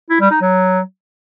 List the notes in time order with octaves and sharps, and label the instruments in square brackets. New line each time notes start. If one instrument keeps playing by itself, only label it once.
[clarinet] E4
G3
D#4
F#3